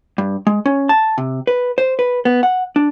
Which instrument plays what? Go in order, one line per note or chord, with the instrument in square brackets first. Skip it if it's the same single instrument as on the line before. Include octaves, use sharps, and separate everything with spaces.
[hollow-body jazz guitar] G2
G#3
C#4
A5
C3
B4
C5
B4
B3
F#5
D4